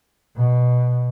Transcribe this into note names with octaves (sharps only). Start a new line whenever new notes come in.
B2